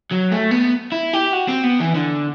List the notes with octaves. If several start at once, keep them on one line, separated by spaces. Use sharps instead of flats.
F#3
A3
B3
E4
G4
F#4
C4
B3
E3
D3